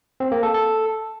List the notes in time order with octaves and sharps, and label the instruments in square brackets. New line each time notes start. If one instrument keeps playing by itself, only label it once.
[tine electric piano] C4
A#3
A4
A4